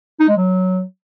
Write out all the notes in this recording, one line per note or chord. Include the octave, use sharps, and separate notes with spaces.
D#4
G#3
F#3